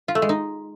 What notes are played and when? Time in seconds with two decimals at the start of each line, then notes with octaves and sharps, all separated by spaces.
0.08 F4
0.15 A3
0.22 G#3
0.29 D#4